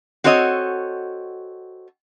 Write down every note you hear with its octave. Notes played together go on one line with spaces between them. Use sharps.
C4 F#4 A4 C#5 D#5